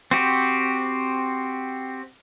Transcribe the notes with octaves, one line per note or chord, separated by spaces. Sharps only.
C4 F#4 G4